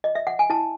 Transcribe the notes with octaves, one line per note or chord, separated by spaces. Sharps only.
D#5
E5
F#5
G#5
E4 A5